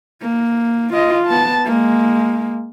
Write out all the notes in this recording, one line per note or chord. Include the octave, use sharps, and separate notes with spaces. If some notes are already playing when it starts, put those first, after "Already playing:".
A#3
F4 D#5
B3 A5
G#3 A#3